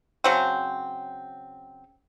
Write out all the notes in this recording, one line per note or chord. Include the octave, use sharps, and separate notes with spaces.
C#3 F#3 C4